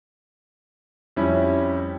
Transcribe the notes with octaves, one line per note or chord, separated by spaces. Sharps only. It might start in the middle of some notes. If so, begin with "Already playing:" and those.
F2 G3 C#4 E4